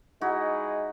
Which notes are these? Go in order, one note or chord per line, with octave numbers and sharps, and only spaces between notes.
G#3 D#4 E4 F#4 F#5